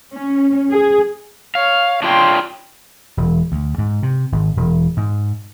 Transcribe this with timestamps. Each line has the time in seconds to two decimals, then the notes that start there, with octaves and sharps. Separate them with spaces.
0.13 C#4
0.70 G#4
1.55 C#5 F5
2.03 D4 F4 C#5 G5 C6
3.17 E1
3.52 D2
3.78 G#2
4.03 C3
4.32 G#1
4.57 E1
4.97 G#2